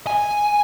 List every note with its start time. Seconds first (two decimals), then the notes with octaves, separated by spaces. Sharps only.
0.07 G#5